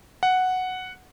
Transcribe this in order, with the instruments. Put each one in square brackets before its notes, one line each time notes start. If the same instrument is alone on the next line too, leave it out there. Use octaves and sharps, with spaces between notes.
[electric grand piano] F#5